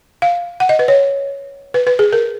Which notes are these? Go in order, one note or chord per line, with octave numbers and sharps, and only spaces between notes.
F5
F#5
D#5
B4
C#5
B4
B4
G#4
A#4